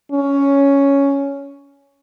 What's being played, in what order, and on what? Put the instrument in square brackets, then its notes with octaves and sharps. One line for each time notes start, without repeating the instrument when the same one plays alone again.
[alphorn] C#4